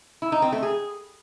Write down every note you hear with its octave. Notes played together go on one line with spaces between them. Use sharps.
E4
D#4
C4
A3
G#4